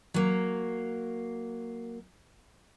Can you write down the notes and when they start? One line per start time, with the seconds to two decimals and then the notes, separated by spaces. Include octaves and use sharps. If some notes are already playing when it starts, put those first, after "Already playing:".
0.14 F#3 A#3